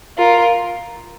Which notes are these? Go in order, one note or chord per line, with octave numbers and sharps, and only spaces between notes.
F4 A#4